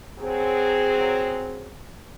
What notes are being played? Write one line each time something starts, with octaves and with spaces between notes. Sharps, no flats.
F#3 C4 G#4